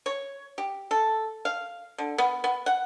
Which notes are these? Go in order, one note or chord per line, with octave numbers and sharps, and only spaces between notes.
C#5
G4
A4
F5
D3
B3
B3
F#5